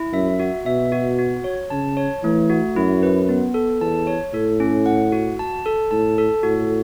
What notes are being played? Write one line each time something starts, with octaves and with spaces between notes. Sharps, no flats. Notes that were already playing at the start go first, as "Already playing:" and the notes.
Already playing: E4
F#2 E5
F#4
B2 E5
F#4
F#4
C#5
C#3 A5
C#5
E3 A3
F#4
F#2 E4
B4
B3
A4
E2 A5
C#5
A2 A4
C#4
F#5
F#4
A5
A4
A2 A5
A4
A2 F#4